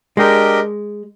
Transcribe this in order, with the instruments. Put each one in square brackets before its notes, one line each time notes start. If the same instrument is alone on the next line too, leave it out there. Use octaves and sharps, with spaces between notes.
[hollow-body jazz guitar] G#3 [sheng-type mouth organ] D4 G4 A#4 D#5 G5